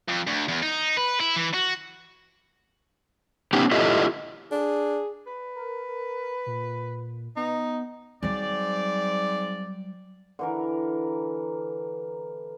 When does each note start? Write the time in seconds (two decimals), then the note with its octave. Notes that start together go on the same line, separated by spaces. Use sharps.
0.09 F2
0.27 D2
0.48 E2
0.63 D#4
0.97 B4
1.20 E4
1.36 E3
1.54 F#4
3.53 B3 C#4 D#4 G4 G5
3.71 E4 F4 G4 A4 D#5 E5
4.52 D4 G#4
5.26 B4
5.55 A#4
6.46 A#2
7.36 B3 D#4
8.23 G#2 F#3 G3 C4 D5
10.39 D3 E3 A#4